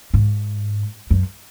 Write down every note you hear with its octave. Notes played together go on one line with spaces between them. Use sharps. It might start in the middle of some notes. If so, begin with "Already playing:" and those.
G#2
F#2